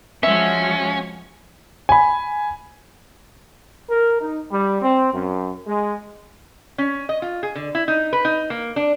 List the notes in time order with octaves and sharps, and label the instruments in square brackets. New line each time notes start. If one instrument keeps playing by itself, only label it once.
[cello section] F3 G#3 F#4 [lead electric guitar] C#4 [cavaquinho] E5
[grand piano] G#5 B5
[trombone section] A#4
D#4
G3
C4
F#2
G#3
[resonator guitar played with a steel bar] C#4
D#5
F4
G#4
D3
E4
D#4
B4
D#4
A#3
D4